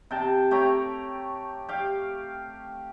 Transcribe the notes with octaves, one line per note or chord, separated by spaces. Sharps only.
C3 G5 A5
A3 G4 C#5 A#5
G4 F5